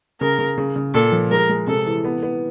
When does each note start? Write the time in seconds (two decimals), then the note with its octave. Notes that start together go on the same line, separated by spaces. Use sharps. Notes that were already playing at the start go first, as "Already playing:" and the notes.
0.21 C#3 A#4
0.39 C#3
0.58 C#3
0.76 C#3
0.94 A#2 A4
1.12 F3
1.31 G#3 A#4
1.49 G#3
1.67 C3 A4
1.87 E3
2.05 B3
2.23 B3